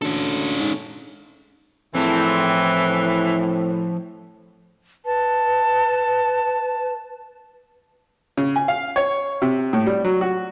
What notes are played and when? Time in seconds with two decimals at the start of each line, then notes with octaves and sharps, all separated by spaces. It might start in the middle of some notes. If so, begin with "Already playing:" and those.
0.02 D2 C#4 A4
0.60 G#2
1.95 A2 E3 F3 C4 G#4 A5
5.06 B4 A5
8.38 C#3
8.56 G#5
8.68 F5
8.96 C#5
9.42 C3
9.73 A2
9.87 G3
10.05 F#3
10.21 F#4